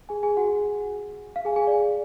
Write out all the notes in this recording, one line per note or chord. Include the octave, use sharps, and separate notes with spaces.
G#4 G#5
G#4 G#5
F#4 F#5
F5
G#4 G#5
G#4 G#5
D5